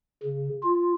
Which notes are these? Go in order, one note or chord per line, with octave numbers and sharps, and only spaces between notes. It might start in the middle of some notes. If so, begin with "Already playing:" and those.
C#3
F4